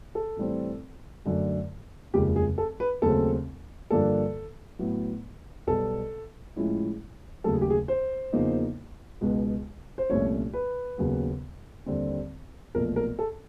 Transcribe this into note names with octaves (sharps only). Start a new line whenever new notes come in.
A4
A2 E3 G3 C4
F#2 D3 F#3 A3 D4
F1 D#2 C#3 F3 G#3 G4
G#4
A4
B4
D#2 C#3 F#3 A3 C4 A4
G2 D3 F3 A#3 D4 A4
A2 F#3 B3
B1 B2 G3 A4
A2 F3 G#3 C#4 E4
D#2 C#3 F#3 A3 A4
G#4
G4
G#4
C5
E2 C#3 F3 A#3 D#4
C#2 B2 G#3
C5
C2 A#2 F3 A3 C#4 C#5
B4
D#2 C#3 F#3 B3
D#2 D3 G3 C4
B1 A#2 F3 A3 A#4
A#4
A4